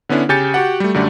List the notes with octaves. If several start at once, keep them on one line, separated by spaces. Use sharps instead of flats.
D3 B3 C#4 D4 E4
C#3 G4 G#5 G6 A6 C#7
F#4 G4 F#5
G3 A3
F#2 D3 G3 A3 D4